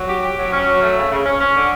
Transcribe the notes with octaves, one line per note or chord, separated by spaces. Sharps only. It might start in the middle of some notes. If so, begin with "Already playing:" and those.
Already playing: F#3
G4
G4
F#3
C#4
F#3
A3
C#3
C#3
C#4
C#4
D3